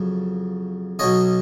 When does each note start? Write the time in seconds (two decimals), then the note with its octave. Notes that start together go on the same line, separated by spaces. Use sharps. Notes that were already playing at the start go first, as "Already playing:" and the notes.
Already playing: F2 C#3 F#3
0.99 B1 B2 F#3 C#5 D#5